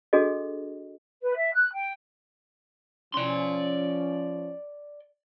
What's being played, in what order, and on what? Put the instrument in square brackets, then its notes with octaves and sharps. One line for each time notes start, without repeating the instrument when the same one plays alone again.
[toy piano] D4 F#4 G#4 A4 D#5
[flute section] B4
E5
F#6
G5
[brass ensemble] F3 C#4 [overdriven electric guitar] D5 C6